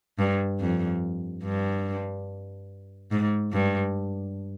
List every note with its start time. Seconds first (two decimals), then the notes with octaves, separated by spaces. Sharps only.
0.19 G2
0.60 F2
1.44 G2
3.11 G#2
3.53 G2